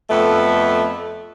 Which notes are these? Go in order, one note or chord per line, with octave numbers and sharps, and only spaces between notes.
F2 A3 B3